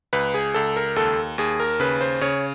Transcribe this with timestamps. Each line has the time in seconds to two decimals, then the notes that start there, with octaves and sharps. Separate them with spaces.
0.13 C#2 B4
0.34 G#4
0.54 C#2 A4
0.77 A#4
0.96 D#2 A4
1.38 D#2 G#4
1.60 A#4
1.80 C#3 B4
2.01 C5
2.21 C#3 C#5